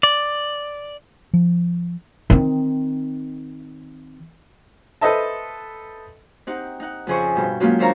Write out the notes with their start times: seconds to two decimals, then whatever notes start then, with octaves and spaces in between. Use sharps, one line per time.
0.03 D5
1.33 F3
2.30 D#3 C4
5.01 A4 B4 C5 D#5 E5 A5
6.47 C4 D#4 G4 F#5
6.80 D#4 F#5
7.07 F2 C#3 F3 G#4 C5 C#6
7.35 G2 B2 G5
7.60 F#3 G#3 A#3 C#4 F4 G4
7.79 D#2 D4 C5 C#5 F5 A#5